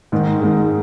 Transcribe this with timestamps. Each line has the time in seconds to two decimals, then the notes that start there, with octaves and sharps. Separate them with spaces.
0.12 G#2 D#3 G#3 D#4
0.41 G#2 D#3 G#3 D#4